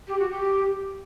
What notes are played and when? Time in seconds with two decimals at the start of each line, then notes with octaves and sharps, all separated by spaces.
0.08 G4
0.19 F#4
0.30 G4